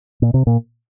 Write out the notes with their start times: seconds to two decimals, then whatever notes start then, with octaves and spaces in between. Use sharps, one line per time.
0.22 A#2
0.34 C3
0.47 A#2